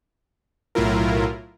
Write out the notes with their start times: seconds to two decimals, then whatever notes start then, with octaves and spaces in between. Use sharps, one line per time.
0.75 B1 A2 F#3 E4 F4 A#4